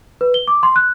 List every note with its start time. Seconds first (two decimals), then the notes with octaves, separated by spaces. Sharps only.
0.21 B4
0.34 G7
0.48 D6
0.63 C6
0.76 F#6